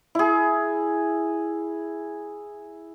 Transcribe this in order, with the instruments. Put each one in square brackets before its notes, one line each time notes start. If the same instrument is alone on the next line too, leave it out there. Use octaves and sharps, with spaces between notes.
[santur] E4 G#4